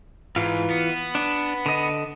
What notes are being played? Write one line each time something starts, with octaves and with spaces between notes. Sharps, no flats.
G#2 E3 F4
B3
D4
D3 D#5